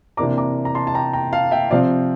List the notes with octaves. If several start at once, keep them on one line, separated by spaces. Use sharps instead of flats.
C3 E3 A#3 D4 A#5 D6
A#5 D6
A#5
A5 C6
A5
G5 A#5
G5 A#5
F5 A5
E5 G5
C3 F3 C4 D5 F5